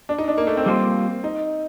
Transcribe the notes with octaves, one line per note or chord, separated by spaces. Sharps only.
D4
D#4
D4
A#3
A3
C4
G3 A#3 F4 C5
D#4